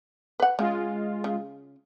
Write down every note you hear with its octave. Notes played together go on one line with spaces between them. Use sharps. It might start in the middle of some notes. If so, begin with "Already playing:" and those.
B4 F#5
C#3 G#3 F4
C#3